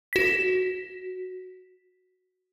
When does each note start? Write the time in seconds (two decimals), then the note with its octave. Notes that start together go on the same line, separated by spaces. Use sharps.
0.13 F#4 B6